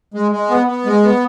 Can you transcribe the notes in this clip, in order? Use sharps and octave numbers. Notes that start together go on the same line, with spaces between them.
G#3
G#3
B3
B3
G#3
B3